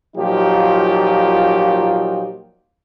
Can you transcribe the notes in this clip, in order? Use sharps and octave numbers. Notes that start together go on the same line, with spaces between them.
A#2 F3 F#3 D#4 F4 G4